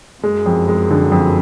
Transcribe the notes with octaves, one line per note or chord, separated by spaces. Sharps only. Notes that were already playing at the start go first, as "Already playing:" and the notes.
F#2 G#3
F2
G#3
D3
F2